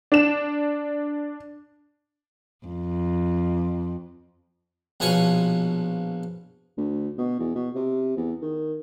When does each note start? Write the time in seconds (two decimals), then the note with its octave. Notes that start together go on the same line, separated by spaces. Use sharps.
0.12 D4 E7
2.67 F2
5.00 A#1 B2 F3 C#5 G#5 C#6
6.77 D2
7.18 B2
7.39 E2
7.55 B2
7.75 C3
8.17 E2
8.42 D#3